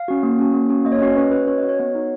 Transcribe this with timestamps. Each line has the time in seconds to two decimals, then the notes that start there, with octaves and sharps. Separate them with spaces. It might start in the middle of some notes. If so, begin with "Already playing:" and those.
Already playing: F5
0.08 C#4 F#4
0.23 A#3
0.39 C#4 F#4
0.54 A#3
0.70 C#4 F#4
0.85 A#3 D#5
0.92 C#5
0.99 C#4 F#4 D#5
1.16 C#4 B4
1.24 C#5
1.31 F#4 B4
1.47 C#4 C#5
1.58 F#4 D#5
1.69 C#5
1.79 B3 C#5
1.95 D#4 F#4